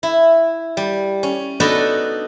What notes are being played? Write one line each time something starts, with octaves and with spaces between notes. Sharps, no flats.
E4
G3
C#4
B3 D4 D#4 F#4 A4 B4